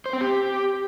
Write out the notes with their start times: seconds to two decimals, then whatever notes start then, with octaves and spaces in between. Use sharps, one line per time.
0.06 C5
0.13 C4
0.21 G4